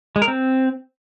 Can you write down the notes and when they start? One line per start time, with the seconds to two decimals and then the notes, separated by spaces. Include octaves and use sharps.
0.16 G#3
0.22 A#4
0.28 C4